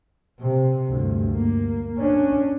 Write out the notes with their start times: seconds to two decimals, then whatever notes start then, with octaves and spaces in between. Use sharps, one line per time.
0.40 C3
0.88 D2 G2
1.36 A#3
1.99 C#4 D4